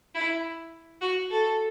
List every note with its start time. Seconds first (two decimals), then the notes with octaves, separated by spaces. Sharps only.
0.15 E4
1.01 F#4
1.30 A4